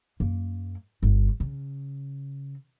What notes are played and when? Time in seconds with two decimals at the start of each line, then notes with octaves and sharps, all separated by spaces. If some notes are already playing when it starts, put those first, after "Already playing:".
0.20 F#2 A#3
1.03 G1
1.40 C#3